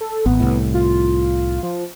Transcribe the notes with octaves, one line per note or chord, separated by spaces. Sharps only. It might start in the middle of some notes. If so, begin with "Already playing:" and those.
A4
G#1 B3
C2 A2
F4
F3